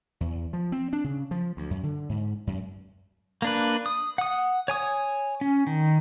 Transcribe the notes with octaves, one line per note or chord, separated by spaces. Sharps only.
E2
F3
C4
D4
C#3
F3
D2
F#2
D3
G#2
F#2
A#3 D4 B4
D#6
F#5 D#6
C#5 G#5 D#6
C#4
D#3